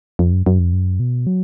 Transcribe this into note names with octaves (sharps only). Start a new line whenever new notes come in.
F2
F#2
F#2
F2
F#2
B2
F#3